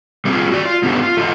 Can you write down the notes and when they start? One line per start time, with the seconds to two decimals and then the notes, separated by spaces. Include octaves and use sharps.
0.25 G3 A3 C4 E4 F4 G#4
0.51 F#4 D5
0.65 F4
0.83 A3 B3 C#4 D4 G4
1.03 F4
1.17 A3 F4 D#5